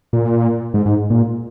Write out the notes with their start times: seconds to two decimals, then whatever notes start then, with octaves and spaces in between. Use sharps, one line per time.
0.13 A#2
0.74 G#2
0.86 G#2
1.10 A#2